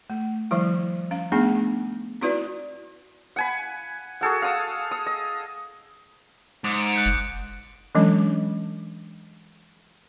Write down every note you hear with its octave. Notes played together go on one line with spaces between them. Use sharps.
A3
D#3 F3 G3 E4
C#4 F5
A3 B3 D4 D#4 G#4
C4 D#4 E4 F#4 B4 D5
F#5 G#5 B5
F#4 G#4 A4 F#5
F5 F#5 D#6 E6
D#6
D#5
G#2 D6 D#6 C#7
D7
F#6 G6 C#7
F#1
E3 F#3 G#3 C#4 D4